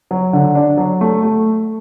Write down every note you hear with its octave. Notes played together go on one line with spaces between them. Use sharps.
F#3
D3
D4
F#3
A3
A3